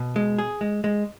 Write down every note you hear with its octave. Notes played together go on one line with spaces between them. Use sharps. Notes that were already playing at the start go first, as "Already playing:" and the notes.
Already playing: B2
G#3
G#4
G#3
G#3